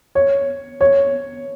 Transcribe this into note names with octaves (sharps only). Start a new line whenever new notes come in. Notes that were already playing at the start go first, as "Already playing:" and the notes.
C#5
C#5